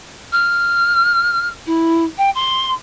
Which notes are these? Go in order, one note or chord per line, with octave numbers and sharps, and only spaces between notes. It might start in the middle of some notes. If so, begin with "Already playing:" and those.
F6
E4
G5
C6